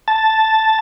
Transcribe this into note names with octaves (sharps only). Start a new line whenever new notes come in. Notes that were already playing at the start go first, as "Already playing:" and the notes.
A5